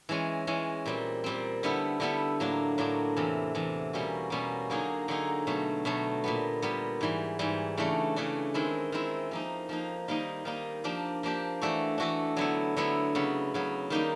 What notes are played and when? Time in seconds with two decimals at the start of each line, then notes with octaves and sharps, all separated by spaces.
0.09 E3 G#3 C#4
0.47 E3 G#3 C#4
0.86 A#2 G3 C4
1.24 A#2 G3 C4
1.63 D3 G3 B3 E4 A4
2.00 D3 G3 B3 E4 A4
2.40 A2 F#3 A#3 D4
2.78 A2 F#3 A#3 D4
3.16 E2 C3 E3
3.55 E2 C3 E3
3.93 B2 G3 A#3 C#4 F#4
4.30 B2 G3 A#3 C#4 F#4
4.70 D3 F#3 A#3 D#4 G#4
5.08 D3 F#3 A#3 D#4 G#4
5.47 B2 F#3 A3
5.85 B2 F#3 A3
6.24 A#2 G3 B3
6.62 A#2 G3 B3
7.01 G#2 E3 G3
7.39 G#2 E3 G3
7.77 C#3 E3 A3 D4
8.16 C#3 E3 A3 D4
8.54 D#3 G#3 C4 E4
8.92 D#3 G#3 C4 E4
9.31 F3 A#3 D#4
9.69 F3 A#3 D#4
10.08 D#3 G3 A#3 D#4
10.45 D#3 G3 A#3 D#4
10.84 F3 A#3 D4 G4
11.23 F3 A#3 D4 G4
11.61 E3 A3 D4 F#4 A4
11.98 E3 A3 D4 F#4 A4
12.37 D3 F#3 B3 E4
12.76 D3 F#3 B3 E4
13.15 C#3 F#3 B3
13.54 C#3 F#3 B3
13.90 D#3 G3 A#3 D#4 G4